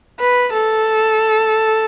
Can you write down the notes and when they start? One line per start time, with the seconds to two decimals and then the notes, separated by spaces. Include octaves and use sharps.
0.20 B4
0.53 A4